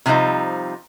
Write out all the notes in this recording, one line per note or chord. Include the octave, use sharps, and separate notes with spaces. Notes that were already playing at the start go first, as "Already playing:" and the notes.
C3 F3 G3 C4 D#4 F4